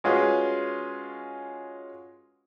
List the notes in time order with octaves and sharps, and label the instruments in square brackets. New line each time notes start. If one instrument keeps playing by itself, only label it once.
[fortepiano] G#3 C#4 F4 F#4 G#4 B4